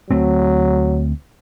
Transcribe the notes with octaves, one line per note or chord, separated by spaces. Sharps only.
D2 F#3 A3 C4